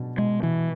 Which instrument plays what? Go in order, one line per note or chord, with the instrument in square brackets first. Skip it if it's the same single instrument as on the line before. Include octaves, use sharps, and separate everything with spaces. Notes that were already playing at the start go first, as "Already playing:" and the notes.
Already playing: [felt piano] B2 F#3 D4
[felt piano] B2 [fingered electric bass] G#3
[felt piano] B2 [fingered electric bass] E3